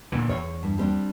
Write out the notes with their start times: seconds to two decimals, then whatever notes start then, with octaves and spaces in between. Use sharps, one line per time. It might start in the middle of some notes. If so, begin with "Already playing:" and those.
0.12 A#2 D3 E3 B3
0.29 E2 C#5
0.63 G2
0.78 G3 C4 D4